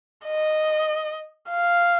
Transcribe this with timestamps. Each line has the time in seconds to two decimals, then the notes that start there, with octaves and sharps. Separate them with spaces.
0.25 D#5
1.50 F5